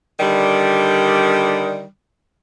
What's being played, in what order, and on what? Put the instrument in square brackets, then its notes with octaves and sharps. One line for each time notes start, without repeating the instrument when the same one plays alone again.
[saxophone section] D3 D#3 G3